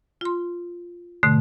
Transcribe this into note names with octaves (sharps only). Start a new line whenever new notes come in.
F4 C6
G#2 B2 D3 A3